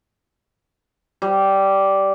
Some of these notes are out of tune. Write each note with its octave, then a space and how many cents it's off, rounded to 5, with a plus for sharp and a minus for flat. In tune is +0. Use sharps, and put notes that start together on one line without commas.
G3 -10